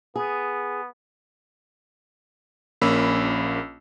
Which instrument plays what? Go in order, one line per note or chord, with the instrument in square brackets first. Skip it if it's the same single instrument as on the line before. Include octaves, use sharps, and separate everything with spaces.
[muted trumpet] B3 [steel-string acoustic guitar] G#4
[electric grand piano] A#1 A#3 C#4 B5 E6